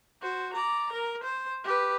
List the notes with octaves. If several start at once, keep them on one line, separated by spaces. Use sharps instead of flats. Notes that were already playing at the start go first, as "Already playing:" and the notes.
F#4 C5
D5 A#5
A#4
C5
G4 B4